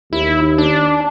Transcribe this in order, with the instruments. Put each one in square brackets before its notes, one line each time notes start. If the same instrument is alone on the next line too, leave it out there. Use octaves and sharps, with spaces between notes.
[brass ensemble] D#2 [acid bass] E4
[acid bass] D4